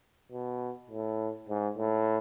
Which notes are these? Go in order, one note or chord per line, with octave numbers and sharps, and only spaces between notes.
B2
A2
G#2
A2